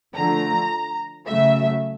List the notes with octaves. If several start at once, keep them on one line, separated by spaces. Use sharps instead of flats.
D3 F3 A3 A#5
C#3 F#3 A3 E5